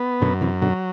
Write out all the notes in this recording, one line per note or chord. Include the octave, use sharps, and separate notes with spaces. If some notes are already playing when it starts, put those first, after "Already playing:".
Already playing: B3
F#2 B2 D3
C3 E3
B2 D3 F#3